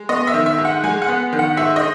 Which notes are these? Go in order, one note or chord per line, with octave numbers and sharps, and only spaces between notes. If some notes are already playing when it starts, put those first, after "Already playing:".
Already playing: G#3
B3 D#5
E5
D#3
E5
G#2
F#5
G#3 G#5
F#5
B3
D#3
F#5
G#2 E5
D#5